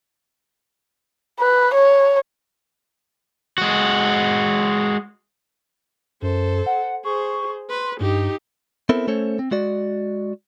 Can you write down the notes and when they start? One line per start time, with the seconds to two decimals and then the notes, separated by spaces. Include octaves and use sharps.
1.40 B4
1.74 C#5
3.58 G#3 F#4
6.22 F#2 A4 C5
6.66 F#5
7.05 G#4 C5 C#6
7.69 B4 C6
8.00 G2 D#4 G4
8.89 B3 C4 E4 A4 A#4 C5
9.08 A3 C#4 A4 C5 C#5
9.39 C4
9.51 G#3 F#4 D5